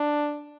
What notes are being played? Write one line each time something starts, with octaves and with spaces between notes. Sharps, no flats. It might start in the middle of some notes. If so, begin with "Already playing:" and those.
Already playing: D4